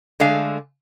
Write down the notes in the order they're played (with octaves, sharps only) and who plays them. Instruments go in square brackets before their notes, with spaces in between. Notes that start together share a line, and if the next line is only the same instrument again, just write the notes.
[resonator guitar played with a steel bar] D3 G#3 A3 F5